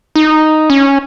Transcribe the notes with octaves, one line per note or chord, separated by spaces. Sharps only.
D#4
C#4